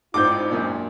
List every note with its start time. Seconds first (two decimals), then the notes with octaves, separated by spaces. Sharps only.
0.14 A1 G#2 C4 F4 D5 G5 D6 G6
0.49 F#2 A#2 D4